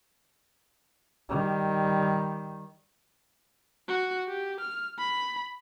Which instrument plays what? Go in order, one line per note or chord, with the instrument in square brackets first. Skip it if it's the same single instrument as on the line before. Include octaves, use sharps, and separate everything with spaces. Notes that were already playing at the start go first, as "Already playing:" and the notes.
[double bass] D#3 G3
[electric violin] F#4
G4
F6
B5